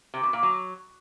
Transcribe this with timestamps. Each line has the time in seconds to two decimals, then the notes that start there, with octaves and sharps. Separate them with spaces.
0.14 C3
0.23 B2
0.33 A#2
0.43 F#3